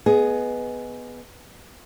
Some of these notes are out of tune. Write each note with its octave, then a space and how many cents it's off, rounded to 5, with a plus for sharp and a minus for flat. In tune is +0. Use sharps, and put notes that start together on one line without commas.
B3 +0 G#4 +15 D#5 +0